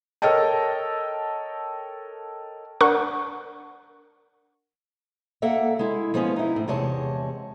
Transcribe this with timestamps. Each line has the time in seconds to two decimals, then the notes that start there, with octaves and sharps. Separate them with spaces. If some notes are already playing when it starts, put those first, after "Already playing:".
0.22 A4 A#4 C#5 D#5 G5 A5
2.81 D4 A#4 F#5 C#6
5.42 A#3 A4 E5 F#5
5.79 G#3 E4
6.14 F3 G#3 B3 C#4
6.36 D#4 E4
6.56 A2
6.67 E2 C3 G#3 C#5 A5